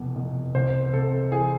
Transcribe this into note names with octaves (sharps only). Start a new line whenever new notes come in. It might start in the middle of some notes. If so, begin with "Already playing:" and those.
Already playing: F1 E2 B2
F1
C2 C5
C3 A4
E3 G#4